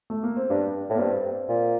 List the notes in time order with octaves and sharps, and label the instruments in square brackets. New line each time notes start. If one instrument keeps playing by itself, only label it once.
[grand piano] A3
A#3
C4
[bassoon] G2 [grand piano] D4
[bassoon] A2
[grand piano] A#3
[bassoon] G2 [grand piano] C4
[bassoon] A#2